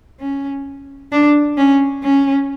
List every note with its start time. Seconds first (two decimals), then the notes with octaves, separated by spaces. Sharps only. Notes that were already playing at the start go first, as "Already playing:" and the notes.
0.20 C#4
1.12 D4
1.57 C#4
2.03 C#4